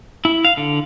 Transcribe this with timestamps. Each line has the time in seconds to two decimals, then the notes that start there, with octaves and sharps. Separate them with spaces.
0.25 E4
0.45 F5
0.57 D3